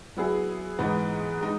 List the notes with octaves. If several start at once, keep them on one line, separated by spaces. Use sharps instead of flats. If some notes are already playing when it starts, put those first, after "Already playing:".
F#3 B3 E4 G#4
G#2 E3 B3 D#4
G#3 D#4